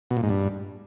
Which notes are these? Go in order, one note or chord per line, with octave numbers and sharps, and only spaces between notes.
B2
A#2
G#2
G2